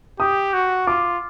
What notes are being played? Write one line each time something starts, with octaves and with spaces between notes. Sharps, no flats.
G4 D#6
F#4
F4 D6